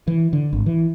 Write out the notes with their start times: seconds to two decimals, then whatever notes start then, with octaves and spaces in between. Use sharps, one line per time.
0.08 E3
0.33 D3
0.53 G#1
0.66 E3